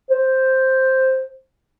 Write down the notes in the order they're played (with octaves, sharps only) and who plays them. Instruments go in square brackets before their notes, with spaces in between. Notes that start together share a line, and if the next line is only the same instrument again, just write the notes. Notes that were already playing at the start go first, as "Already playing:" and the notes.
[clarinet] C5